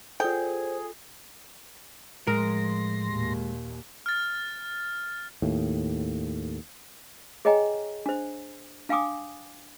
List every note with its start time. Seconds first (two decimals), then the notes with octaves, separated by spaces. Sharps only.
0.20 F4 G#4 A4 C5 G5
2.27 A2 F3 G#3 A#4 C6 A#6
3.08 D#2 A#2
4.06 F6 A6
5.42 D#2 A2
7.45 G#4 C#5 D#5 G5 G#5 A#5
8.06 D4 C5
8.89 D4 F5 G5 G#5 D6 D#6